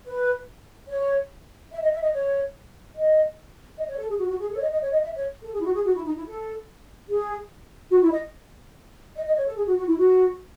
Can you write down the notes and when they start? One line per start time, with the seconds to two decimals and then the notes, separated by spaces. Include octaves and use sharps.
0.05 B4
0.88 C#5
1.71 E5
1.82 D#5
1.92 E5
2.02 D#5
2.13 C#5
2.95 D#5
3.77 D#5
3.88 C#5
3.98 A4
4.09 G#4
4.19 F#4
4.29 F#4
4.39 G#4
4.50 A4
4.56 C#5
4.61 D#5
4.71 D#5
4.81 C#5
4.91 D#5
5.02 E5
5.16 C#5
5.43 A4
5.53 G#4
5.59 E4
5.64 F#4
5.74 G#4
5.85 F#4
5.95 E4
6.05 D#4
6.16 E4
6.26 A4
7.08 G#4
7.91 F#4
8.01 E4
8.11 D#5
9.15 D#5
9.26 D#5
9.36 C#5
9.47 A4
9.56 G#4
9.67 F#4
9.77 F#4
9.87 E4
9.98 F#4